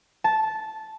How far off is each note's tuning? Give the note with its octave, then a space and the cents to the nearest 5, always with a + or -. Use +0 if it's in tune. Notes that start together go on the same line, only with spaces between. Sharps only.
A5 -10